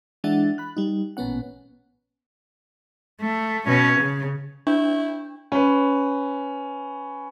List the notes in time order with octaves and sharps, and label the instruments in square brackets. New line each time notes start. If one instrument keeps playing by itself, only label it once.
[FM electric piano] E3 G#3 D4 E5 F#5 A6
B5 F#6
G3 D#4
A1 A#2 B3 C#4 F#5
[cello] A3
B2 C#4
C#3
[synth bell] D4 [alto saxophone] E4
[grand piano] C#4 B4